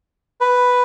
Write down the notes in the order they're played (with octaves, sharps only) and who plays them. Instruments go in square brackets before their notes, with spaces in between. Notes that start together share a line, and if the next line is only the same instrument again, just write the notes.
[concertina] B4